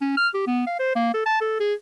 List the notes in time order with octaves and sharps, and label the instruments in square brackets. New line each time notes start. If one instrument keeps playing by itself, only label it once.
[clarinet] C#4
F6
G4
B3
F5
C5
A#3
A4
A5
A4
G#4